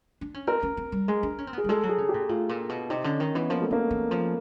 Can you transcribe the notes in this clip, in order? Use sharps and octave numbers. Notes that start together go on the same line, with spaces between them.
D4
C#4
C4 A#4
C#4
C4
G3
G#3
D4
C#4
C4
B3 G#4
G3
G#3 A4
F#3
G#4
C#3
G4
A#2
A2 F4
A#2
B2
C3 D#4
D3 C#4
D#3
E3 B3
F3 A#3
A3
F3 A#3
E3
F3